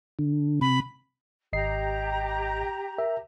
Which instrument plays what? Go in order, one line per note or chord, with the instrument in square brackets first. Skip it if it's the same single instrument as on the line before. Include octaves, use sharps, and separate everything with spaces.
[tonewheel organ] D3
[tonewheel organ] C3 [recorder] B5
[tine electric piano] G#1 D#5 C7 [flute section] G4 A#5
[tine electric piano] A#4 E5